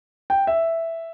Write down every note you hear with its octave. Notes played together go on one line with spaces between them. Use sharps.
G5
E5